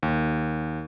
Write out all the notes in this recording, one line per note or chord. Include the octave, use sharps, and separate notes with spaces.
D#2